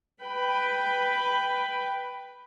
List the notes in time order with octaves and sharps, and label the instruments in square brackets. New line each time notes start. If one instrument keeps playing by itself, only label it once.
[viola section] B4 G5 B5